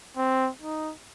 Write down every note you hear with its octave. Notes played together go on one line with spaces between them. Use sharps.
C4
D#4